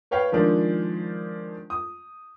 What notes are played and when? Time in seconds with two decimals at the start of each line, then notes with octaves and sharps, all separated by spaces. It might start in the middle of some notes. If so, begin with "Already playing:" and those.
0.11 B4 C#5 F5 G5
0.32 D#3 F3 G#3 D4
1.70 D#6